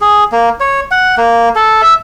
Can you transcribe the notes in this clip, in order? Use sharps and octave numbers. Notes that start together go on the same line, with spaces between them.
G#4
A#3
C#5
F#5
A#3
A4
E5